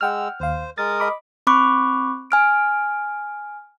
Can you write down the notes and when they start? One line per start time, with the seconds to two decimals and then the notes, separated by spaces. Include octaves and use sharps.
0.01 G#3 F#5 G5 E6 F6
0.40 D#2 C5 F5
0.78 G#3 A#4 D#6 A6
1.00 D#5 B5 D6
1.47 C4 B5 C#6 D6 F#6
2.31 G#5 F6 D7